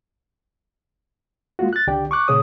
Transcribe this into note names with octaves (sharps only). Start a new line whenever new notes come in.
G#3 A#3 F4 F#4
F#6 A6
C#2 D3 G4 D5 G5
C#6 D6 F#6
A#2 C#3 G#4 C#5 D#6